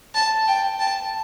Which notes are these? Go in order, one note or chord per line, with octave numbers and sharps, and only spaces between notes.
A5
G5
A5